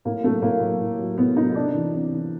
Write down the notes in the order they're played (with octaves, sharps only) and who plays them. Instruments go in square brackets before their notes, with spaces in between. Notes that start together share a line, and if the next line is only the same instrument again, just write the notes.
[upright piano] A2 A#3
F#3 A3
A2 A#3
F#3
A2
F#3
A2 B3
F#3 D#4
C3 D4
E3
C3
E3